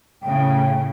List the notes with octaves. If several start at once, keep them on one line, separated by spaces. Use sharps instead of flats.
A2 C#3 G5